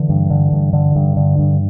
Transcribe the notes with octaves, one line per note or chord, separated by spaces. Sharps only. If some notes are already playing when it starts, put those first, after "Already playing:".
Already playing: D3 E3
G2
D3
G2
D3
G2
D3
G2